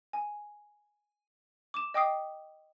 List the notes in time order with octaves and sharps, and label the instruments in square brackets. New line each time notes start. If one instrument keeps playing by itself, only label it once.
[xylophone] G#5
D6 E7
D#5 G5 D6 D#6 C7